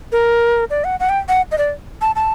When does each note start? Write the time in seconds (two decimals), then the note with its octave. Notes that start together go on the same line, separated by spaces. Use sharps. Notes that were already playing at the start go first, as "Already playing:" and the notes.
0.12 A#4
0.70 D5
0.84 F#5
1.00 F#5
1.09 G5
1.29 F#5
1.52 D#5
1.58 D5
2.02 A5
2.16 A5